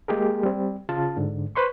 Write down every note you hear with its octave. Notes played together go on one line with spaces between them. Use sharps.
G#3 A#3 G4 G#4 A#4
G3 C4
C#3 F4 A5
G#2 D3
B4 C5 C6 C#6